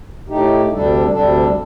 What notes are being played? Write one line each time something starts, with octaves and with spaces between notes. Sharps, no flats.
A2 A3 D#4 G4
D2 C3 G3 D4 A4
D2 C3 G3 D4 A4